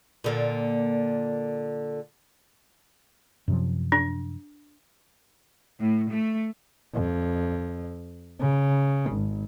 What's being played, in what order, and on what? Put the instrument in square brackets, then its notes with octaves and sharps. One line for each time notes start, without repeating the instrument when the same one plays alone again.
[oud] A#2 D3 A#3
[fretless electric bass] F#2 C3 F3
[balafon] D4
[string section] A2
A3
[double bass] F2
C#3
G#1